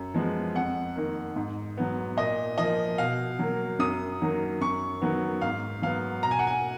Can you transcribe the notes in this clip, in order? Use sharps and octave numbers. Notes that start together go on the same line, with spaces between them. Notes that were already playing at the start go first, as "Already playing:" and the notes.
Already playing: F#2
F3 G#3 B3
F2 F#5
D#3 A#3
G#2
F#3 B3
A#2 D#5
F3 A#3 D#5
B2 F5
F#3 A#3
F#2 D#6
D#3 F#3 A#3
F#2 C#6
D#3 F#3 B3
G#2 F5
F#3 B3 F5
B2 A#5
G#5
F#5
G#5